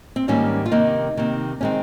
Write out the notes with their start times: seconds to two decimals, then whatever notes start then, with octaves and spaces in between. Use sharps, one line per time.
0.16 C4
0.28 G#2 D#3 G3 A#3 C#4
0.66 F4
0.71 C3 D#3 A#3 D#4
1.17 C3 D#3 A#3
1.61 D#3 G#3 C4 C#4